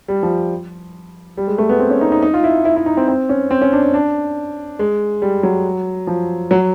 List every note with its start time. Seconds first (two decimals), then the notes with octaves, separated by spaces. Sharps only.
0.08 G3
0.23 F3
1.37 G3
1.48 G#3
1.58 A3
1.69 B3
1.80 C4
1.90 C#4
2.01 D#4
2.12 D#4
2.23 D#4
2.34 F4
2.44 E4
2.65 E4
2.76 E4
2.86 D#4
2.97 C4
3.08 C4
3.29 C#4
3.51 C4
3.62 C#4
3.72 D4
3.83 D4
3.94 D4
4.79 G#3
5.22 G3
5.43 F#3
6.07 F3
6.51 F#3